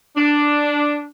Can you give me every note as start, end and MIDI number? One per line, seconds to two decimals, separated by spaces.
0.17 1.05 62